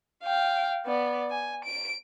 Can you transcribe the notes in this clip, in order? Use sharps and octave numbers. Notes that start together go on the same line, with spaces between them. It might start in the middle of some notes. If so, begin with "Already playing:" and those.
F5 G5
B3 D5
G#5
D7